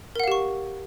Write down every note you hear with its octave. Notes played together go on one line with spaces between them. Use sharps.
G4 A#4 F5 F#5 C#6